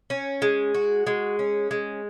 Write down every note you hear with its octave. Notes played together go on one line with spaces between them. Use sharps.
C#4
G#3
F#4
G#3
C#4
G#3